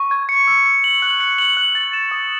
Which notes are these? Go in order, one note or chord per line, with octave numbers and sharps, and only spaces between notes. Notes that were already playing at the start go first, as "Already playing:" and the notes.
Already playing: C#6
G#6
C#7
E6
C#7
F#7
F#6
C#7
F#7
F#6
A6
E7
D#6